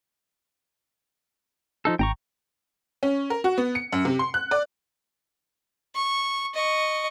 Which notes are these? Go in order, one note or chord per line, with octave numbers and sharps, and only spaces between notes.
F3 D#4 A4
G#1 G5 A#5 C#6
C#4
A#4
F#4
B3
C#7
F#2
C3
C6
F#6
D5
C#6
D#5 C#6